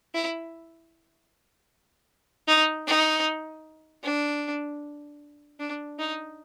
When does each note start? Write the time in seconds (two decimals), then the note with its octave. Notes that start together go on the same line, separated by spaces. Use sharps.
0.14 E4
2.48 D#4
2.87 D#4
4.04 D4
5.60 D4
5.99 D#4